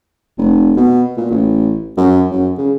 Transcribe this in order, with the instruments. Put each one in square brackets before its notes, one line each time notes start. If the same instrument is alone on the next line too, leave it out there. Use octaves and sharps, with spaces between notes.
[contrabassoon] F1
B2
A#2
A1
F#2
F#2
C#3